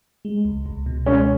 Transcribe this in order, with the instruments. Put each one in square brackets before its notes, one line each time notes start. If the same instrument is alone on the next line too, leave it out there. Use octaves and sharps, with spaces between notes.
[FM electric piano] G#3
C#2
C#2
B2
[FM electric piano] G#3 [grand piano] C#4